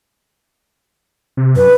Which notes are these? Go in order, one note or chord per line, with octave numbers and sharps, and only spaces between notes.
C3
F#2 B4